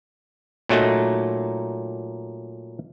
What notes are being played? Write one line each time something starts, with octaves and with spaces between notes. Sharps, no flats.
A#2 F#3 A3 D#4